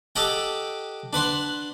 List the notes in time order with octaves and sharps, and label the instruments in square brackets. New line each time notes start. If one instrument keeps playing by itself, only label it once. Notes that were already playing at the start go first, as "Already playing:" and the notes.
[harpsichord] G4 A4 D#5 F#5 G5
D4 B4 F#5 C6